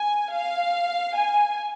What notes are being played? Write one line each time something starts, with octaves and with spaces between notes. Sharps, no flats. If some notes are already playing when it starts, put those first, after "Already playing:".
Already playing: G#5
F5
G#5